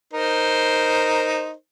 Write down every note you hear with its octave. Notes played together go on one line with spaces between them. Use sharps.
D#4 A#4 C5